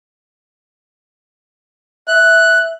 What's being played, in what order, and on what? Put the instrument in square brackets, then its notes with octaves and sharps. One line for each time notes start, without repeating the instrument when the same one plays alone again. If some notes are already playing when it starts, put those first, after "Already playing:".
[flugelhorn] E5 [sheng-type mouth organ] F#6